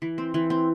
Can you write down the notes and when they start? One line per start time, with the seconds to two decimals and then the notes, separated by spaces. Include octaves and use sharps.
0.02 E3
0.18 C4
0.34 E3
0.50 C4